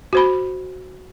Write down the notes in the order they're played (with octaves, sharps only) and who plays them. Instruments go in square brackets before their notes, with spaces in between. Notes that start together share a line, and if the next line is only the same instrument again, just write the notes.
[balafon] F#4 C5 B5